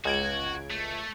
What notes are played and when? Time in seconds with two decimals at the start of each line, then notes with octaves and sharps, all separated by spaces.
0.05 C#2 F#4 G#6 D7
0.70 A3